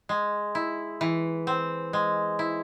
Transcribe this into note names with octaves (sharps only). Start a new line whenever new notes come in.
G#3
E4
E3
C4
G#3
E4